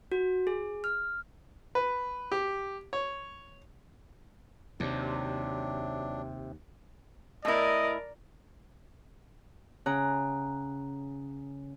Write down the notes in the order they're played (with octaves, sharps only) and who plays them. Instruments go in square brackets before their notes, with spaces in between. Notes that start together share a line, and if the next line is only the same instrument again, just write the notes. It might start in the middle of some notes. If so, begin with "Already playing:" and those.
[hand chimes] F#4
G#4
F6
[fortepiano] B4
G4
C#5
[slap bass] D#2 [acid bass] C3 [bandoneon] F#3 D4
[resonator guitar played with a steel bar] A2 E4 [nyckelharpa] A#4 D5 [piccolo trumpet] D#5
[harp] C#3 F#5 A#5